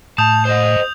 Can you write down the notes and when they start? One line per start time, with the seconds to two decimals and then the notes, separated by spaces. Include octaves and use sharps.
0.18 A2 A5 D#6 G6 F7
0.45 C5 D#5